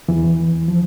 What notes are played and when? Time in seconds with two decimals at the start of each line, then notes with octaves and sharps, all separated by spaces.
0.08 E2 E3
0.68 F3